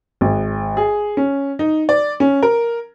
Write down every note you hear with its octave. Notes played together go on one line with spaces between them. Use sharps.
G#1
G#4
C#4
D#4
D5
C#4
A#4